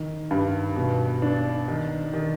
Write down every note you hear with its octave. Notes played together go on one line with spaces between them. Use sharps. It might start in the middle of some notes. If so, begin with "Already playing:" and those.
Already playing: D#3
G2
B2
D4
D#3
D#3